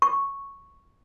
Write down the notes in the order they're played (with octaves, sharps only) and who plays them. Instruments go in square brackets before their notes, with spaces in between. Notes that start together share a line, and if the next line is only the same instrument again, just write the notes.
[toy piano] C#6